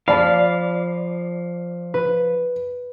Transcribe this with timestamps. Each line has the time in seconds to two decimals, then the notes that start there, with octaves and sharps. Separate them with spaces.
0.08 F3 D5 F5 A5 B5
1.94 B4